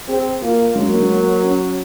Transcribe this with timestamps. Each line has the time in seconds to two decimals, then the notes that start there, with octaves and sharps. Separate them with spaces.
0.08 C4 G#4
0.42 A#3 F4
0.75 F#3 G#3
0.86 A#3
0.95 G#3
1.10 A#3
1.43 C#4